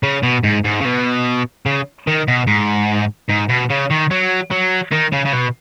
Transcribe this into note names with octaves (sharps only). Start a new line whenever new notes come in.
C#3
B2
G#2
G#2
C#3
B2
C#3
D#3
B2
G#2
G#2
B2
C#3
D#3
F#3
F#3
D#3
C#3
C#3
B2